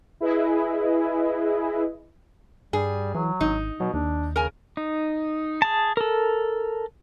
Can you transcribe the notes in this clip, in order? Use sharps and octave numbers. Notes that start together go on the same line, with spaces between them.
E4 G#4 B4 D#5
G2 G3 G#4
E3 F#3
G#1 D#4
B2 F#3
D#2 D4
C#3 A#4 G#5
D#4
G#4 A5
A4 A#4